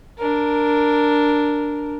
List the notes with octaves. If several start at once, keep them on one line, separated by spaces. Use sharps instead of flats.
D4 A#4